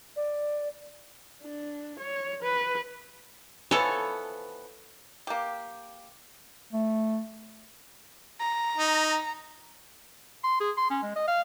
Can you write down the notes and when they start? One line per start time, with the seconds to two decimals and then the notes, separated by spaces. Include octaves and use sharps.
0.16 D5
1.43 D4
2.00 C#5
2.43 B4
3.71 E3 F3 B3 A4 C#5
5.27 A#3 G4
6.73 A3
8.40 A#5
8.77 D#4
10.44 C6
10.60 G#4
10.77 C6
10.90 C#4
11.03 G#3
11.16 D#5
11.28 F5